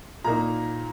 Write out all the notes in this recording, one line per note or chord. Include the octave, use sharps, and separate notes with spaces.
A#2 A#3 D#4 A#5